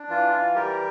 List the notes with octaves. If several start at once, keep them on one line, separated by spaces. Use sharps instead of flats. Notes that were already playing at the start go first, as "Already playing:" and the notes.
Already playing: D4
E3 F4
F4
G3 G4 A#4